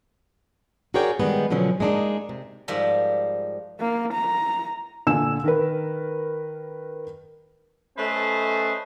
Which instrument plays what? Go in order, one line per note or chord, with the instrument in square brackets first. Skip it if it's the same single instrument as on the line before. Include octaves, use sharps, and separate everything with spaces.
[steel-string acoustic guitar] F#4 G#4 A#4 C#5 D5 G5
D#3 G3 G#3 B3
B2 D3 F3 F#3 C#4
G#3 A#3 D4 D#4 G#4
C3
[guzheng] G#2 F3 G3 A#4 D5 E5
[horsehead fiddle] A#3
A#5
[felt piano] A#2 D3 G#5 E6 E7
D#3 A#4 B4
[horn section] A3 C#4 A4 B4 C5 D#5